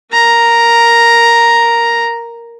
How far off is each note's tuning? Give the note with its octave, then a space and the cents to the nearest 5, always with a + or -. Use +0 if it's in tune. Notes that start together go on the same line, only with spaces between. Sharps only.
A#4 +0 A#5 +0